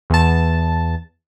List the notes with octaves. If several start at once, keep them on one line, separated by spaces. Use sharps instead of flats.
E2 A5